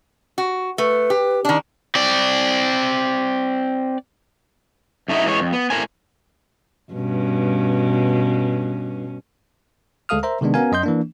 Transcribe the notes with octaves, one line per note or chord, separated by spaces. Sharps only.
F#4
A3 B4
G4
D#3 C#4 D4
C4 D5
F#2 A3 D#4 E4
E3 G#3 G#4 C#5
F2
B3
A2 C4 A#4 C5 G#5
G2 B2 C#4
D2 G#3 A4 F5 D#6 F6
A#4 C5 E5 A#5
C3 D#3 G#3 B3 D4
B3 C#4 F#4 A#4 F5 G#5
F#2 D#5 C6 G6
E3 A#3 D4